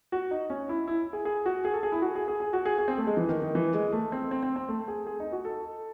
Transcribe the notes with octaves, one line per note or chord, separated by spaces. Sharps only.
F#4
D#4
C#4
E4
E4
G#4
G#4
F#4
G#4
A4
G#4
E4
F#4
G#4
G#4
G#4
F#4
G#4
G#4
C4
A3
G#3
E3
D#3
D#3
E3
G#3
A3
C4
C4
C4
C4
A3
G#4
G#4
D#4
F#4
A4